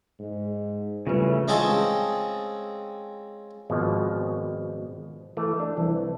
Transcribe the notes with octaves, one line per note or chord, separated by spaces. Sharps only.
G#2
C#3 E3 G3 A3 F4 B4
G#3 C4 C#4 F4 G#4 A4
G#1 B2 F3
E3 A3
D4
C2 E3